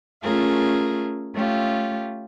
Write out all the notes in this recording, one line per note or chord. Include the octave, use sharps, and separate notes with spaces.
A3 C#4 F4 G#4 A#4
A3 C#4 F4 G4